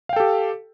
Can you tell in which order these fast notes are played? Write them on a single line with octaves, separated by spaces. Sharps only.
F5 G5 A4 G4